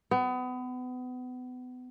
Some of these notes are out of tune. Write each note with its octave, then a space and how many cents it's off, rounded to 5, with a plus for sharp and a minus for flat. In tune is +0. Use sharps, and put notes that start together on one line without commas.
B3 +30